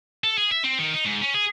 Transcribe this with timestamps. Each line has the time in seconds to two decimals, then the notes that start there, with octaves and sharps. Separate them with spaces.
0.24 A4
0.38 G#4
0.51 E5
0.64 C4
0.78 D#3
0.94 D#4
1.05 G#2
1.21 C#4
1.34 G#4